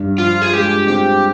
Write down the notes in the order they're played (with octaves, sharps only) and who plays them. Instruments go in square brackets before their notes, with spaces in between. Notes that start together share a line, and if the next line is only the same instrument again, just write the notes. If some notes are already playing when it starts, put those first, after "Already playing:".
Already playing: [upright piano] G2
[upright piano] F3 [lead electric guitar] F4
[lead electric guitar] G#4
[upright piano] G#3 [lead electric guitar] G4
[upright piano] C4 [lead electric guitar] G4